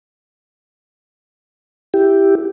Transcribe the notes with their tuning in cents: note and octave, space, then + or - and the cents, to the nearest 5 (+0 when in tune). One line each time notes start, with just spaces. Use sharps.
E4 +0 G4 +0